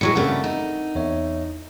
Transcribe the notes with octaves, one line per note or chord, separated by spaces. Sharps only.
A2 F#3 G#3 C#6 C#7
G2 C#3 A3 C4 A#4 F#5
D#4
E2 C#5 E5